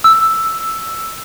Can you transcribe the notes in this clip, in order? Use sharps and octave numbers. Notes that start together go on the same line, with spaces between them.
E6